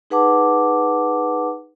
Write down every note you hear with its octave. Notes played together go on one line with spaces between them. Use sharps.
D#4 G#4 B4 F#5 A5 D6